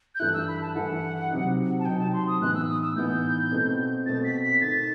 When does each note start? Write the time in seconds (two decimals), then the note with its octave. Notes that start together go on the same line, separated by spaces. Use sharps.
0.15 G6
0.20 G2 E3 A3 E4 F#6
0.34 E6
0.48 B5
0.62 A5
0.75 G2 E3 A3 E4 F#5
1.30 C3 F#3 C4 D#4
1.80 A5
1.85 C3 F#3 C4 D#4 G5
1.99 A5
2.13 C6
2.27 D#6
2.40 A2 E3 B3 D#4 F#6
2.55 E6
2.69 D#6
2.82 E6
2.96 A2 E3 B3 D#4 G6
3.51 B2 A3 C4
4.06 B2 A3 C4 A6
4.24 B6
4.44 B6
4.61 D#3 A3 D#4 A6